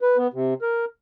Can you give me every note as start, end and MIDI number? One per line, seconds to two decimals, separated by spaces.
0.01 0.17 71
0.17 0.27 59
0.33 0.54 48
0.62 0.85 70